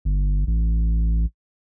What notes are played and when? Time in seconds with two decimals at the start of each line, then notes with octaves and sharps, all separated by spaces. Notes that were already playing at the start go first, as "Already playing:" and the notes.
0.05 G1
0.47 A1